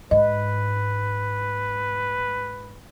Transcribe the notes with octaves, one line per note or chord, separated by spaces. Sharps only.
G#2 B4 D#5